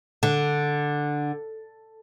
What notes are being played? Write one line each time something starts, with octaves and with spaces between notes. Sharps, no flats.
D3